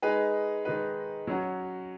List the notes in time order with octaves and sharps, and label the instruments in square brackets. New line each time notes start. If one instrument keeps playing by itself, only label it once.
[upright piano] G#3 D#4 G#4 B4
D#3 G#3 D#4 B4
F#3 C#4 F#4